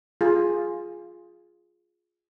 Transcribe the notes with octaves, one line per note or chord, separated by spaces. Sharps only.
F4 G#4